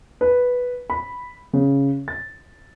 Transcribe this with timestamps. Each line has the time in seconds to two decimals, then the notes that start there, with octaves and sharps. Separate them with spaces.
0.21 B4
0.90 B5
1.53 C#3
2.08 A6